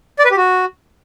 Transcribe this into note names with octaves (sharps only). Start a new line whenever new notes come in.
D5
B4
G4
F#4